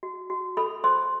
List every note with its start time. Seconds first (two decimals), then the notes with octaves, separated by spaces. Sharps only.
0.03 F#4
0.30 F#4
0.57 A4 B5
0.84 C5 C6